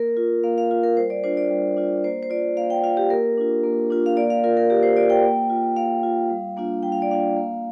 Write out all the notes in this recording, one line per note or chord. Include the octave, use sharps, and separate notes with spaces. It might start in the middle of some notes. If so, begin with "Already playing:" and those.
Already playing: A#3 A#4
F4
A#3 F5
F5
F4
A#4
G3 C5
D5
D4 F4 C5
D5
G3
D4 F4
A#3 C5
C5
F4 D5
A#3 F5
G5
F4 F5
G4
A#3 A#4
D4 F4
A#3
D4 F4
F5
A#3 D5
F5
F4 A#4
A#4
A#3 G4
C5
F4 D5
G5
A#3
F4
A#3 F5
F4
G3
A#3 D4 F4
G3 G5
F5
D5
A#3 D4 F4 F5
A#3